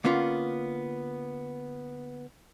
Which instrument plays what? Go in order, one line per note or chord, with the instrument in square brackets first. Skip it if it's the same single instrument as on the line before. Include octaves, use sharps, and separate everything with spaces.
[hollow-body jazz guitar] D3 A#3 B3 C#4 F4